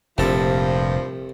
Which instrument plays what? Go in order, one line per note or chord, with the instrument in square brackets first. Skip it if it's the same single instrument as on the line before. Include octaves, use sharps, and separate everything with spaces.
[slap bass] F1 A#2 [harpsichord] C2 A4 [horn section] G2 F3